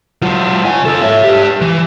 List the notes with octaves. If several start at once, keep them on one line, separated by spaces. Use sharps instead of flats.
F#3 F4
C#3 G#5
F4 A4
C#5 E5
G4 B4
E3